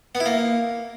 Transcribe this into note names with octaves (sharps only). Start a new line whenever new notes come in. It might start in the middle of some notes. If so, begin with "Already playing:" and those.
B3
E4
A#3